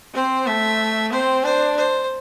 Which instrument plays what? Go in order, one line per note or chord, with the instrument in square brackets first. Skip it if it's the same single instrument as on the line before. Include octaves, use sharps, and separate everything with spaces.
[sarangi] C4 [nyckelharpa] C5
[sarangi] A3 [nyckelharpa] E5
[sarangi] C4 [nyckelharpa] C5
[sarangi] D4 [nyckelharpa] C5
[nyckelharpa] C5